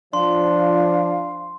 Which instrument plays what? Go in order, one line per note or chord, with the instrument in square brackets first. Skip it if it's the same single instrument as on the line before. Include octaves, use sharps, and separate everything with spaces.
[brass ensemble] F3 [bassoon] D4 [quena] F5 [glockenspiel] C6